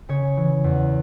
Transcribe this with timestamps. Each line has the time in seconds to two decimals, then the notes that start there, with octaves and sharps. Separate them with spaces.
0.09 C#3 C#5
0.37 E3
0.64 E2